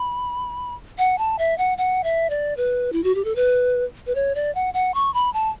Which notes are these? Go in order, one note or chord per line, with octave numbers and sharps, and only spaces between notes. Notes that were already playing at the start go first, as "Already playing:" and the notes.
Already playing: B5
F#5
A5
E5
F#5
F#5
E5
D5
B4
E4
F#4
G4
A4
B4
B4
C#5
D5
F#5
F#5
C#6
B5
A5